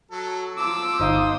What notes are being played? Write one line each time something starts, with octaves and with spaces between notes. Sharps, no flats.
F#3 A4
F3 D6 E6
G1 D#4 C5 F5 D#6